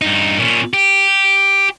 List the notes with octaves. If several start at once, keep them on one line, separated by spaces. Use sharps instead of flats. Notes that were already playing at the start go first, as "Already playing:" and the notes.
G2 D#4
A#2 C#4
G4